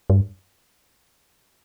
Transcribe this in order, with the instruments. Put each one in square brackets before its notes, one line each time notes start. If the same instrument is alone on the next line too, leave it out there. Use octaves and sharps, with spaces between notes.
[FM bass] G2